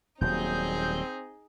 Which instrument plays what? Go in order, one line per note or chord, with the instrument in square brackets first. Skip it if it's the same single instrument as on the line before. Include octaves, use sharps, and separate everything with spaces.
[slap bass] D#1 A#2 F#3 [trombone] C4 [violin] D#4 G#4 [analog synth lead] G6